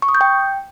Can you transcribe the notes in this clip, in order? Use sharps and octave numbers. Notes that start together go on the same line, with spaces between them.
C#6
D#6
G6
G5